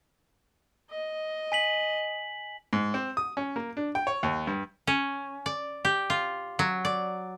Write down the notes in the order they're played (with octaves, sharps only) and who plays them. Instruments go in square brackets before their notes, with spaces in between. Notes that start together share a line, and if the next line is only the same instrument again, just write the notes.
[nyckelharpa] D#5
[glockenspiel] G#5 B6 F#7
[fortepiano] G#2
C4
D#6
C#4
A#3
D4
G5
C#5
D#2
G2
[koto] C#4
D5
G4
F4
F#3
D5